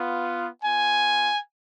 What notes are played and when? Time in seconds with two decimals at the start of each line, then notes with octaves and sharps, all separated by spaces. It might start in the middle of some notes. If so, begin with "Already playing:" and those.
Already playing: B3 F4
0.64 B3 F4 G#5